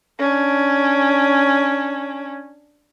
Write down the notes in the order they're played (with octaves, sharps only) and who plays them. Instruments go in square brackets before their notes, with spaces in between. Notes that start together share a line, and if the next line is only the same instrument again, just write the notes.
[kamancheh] C#4 D4